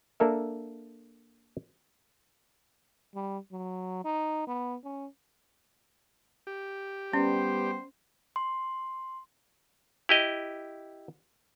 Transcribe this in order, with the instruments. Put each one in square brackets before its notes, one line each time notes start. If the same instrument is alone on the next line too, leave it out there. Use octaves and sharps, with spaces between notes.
[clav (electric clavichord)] A#3 D4 A4 A#4 E5
[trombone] G3
F#3
D#4
B3
C#4
[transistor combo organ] G4
[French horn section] G3 B3 [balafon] C#4 [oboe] C5
[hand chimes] C6
[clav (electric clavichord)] E4 G4 D#5